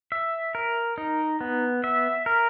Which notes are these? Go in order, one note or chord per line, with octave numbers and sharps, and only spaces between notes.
E5
A#4
D#4
B3
E5
A#4